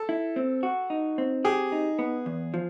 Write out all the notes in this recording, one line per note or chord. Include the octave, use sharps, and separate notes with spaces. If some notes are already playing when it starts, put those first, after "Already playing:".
Already playing: A4
E4
C4
F#4
D#4
C4
G4 G#4
D#4
B3
E2
F3